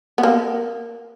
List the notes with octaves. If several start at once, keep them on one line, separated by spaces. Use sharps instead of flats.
B3
A#3